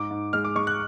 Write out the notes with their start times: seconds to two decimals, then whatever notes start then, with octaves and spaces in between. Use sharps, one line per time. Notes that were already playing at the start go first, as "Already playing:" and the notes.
Already playing: G#2 D6
0.11 G#2
0.33 G#3 F6
0.45 D6
0.56 G#3 C#6
0.67 F#6